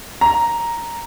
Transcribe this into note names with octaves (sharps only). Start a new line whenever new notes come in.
A#5